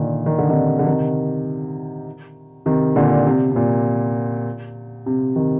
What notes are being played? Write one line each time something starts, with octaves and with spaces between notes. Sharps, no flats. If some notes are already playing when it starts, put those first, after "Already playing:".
Already playing: A#2 D3 D#3
D#3
D3
C3 D#3
D3
C3 D#3
C3 D#3
A#2 D3
C3
C3
A#2
C3
C3 D#3